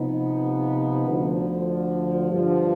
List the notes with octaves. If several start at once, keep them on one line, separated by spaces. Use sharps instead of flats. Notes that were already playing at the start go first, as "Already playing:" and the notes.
Already playing: C3 F3 B3 D#4
D2 D3 F3
G2 D3 F3